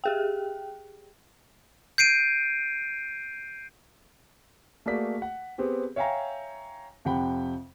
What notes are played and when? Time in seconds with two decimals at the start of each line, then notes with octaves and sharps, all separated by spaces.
0.04 G4 G#4 G5
1.98 G6 C7 D7 D#7
4.86 A3 A#3 F#4 G#4 D5 B6
5.22 F#5
5.58 B3 C4 G4 G#4
5.96 C#5 E5 F5 G5 G#5 A#5
7.05 F2 C3 F#5 G5 B5